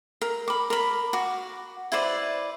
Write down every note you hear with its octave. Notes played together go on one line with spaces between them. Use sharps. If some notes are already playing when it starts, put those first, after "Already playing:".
A#4
B5 D6
A#4 B5
F#4 D6
E4 B4 C5 D5